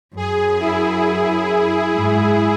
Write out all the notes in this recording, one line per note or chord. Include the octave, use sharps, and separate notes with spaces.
F#2 G#4
E4
G#2